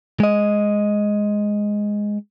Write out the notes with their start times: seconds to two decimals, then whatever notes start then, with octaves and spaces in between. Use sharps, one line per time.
0.20 G#3 D#5